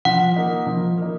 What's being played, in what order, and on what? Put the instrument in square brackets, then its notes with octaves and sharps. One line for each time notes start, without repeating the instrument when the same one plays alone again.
[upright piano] F3 [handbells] F#5
[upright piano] A#3 D#4
F3
A#3 D#4